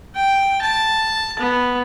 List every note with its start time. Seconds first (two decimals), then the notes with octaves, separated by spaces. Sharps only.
0.15 G5
0.62 A5
1.39 B3